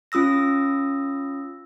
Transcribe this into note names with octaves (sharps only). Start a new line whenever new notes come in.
C#4 F4 D#6 E6 A#6